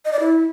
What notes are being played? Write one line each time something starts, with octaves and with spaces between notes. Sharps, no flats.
D#5
D5
E4